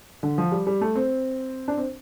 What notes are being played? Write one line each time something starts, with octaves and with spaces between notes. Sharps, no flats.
D3
F3
G3
G3
A3
C4
D4
C4